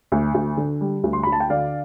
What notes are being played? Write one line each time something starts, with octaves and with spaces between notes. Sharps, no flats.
D2
D2
D3
G3
D2
C6
D2 B5
A5
G5
D3 D5 F5